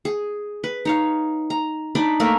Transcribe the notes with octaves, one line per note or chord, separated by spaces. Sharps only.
G#4
B4
D#4 C#5 F5
A#5
D4 D#4 D5 B5
A3 A#3 A#4 E5